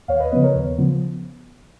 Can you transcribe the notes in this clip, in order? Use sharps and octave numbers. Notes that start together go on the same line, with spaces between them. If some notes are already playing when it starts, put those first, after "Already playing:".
D#2 C#5 F5
B4 D#5
C#3 F3 B3 B4 D#5
A#4 C#5
D#2
C#3 F3 B3